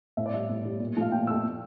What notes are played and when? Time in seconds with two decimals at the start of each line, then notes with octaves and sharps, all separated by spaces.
0.17 A2 E5
0.26 D5
0.34 G3 E5
0.49 A2
0.65 G3
0.80 A#2
0.96 F3 A3 F5
1.12 A#2 G5
1.27 F3 A3 E6